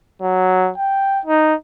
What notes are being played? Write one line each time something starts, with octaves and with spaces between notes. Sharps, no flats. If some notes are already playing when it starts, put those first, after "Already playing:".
F#3
G5
D#4